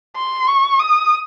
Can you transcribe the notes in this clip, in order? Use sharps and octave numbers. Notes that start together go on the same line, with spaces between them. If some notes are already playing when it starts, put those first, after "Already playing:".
C6
C#6
D#6